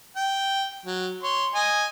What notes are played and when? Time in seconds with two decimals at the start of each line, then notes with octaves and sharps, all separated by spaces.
0.16 G5
0.86 F#3
1.23 C#5 C6
1.54 D#5 G#5